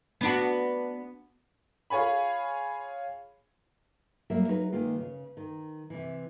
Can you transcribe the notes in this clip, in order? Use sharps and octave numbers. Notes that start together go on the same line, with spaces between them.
B3 D4 F#4
F4 G#4 C#5 G#5 B5
F#3 G3 A#3 A#4 E5
F#3 D#4 G#4 B4
D#3 G#3 A#3 F4
C#3
D#3
C3 E3